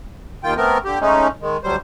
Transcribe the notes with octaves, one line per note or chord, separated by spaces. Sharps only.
D#2 D#3 F4 G5
A3 B3 C4 A#4
D3 G4
G#3 A3 C#4 D#4
D#3 G#3
D2 F#3 G3 C5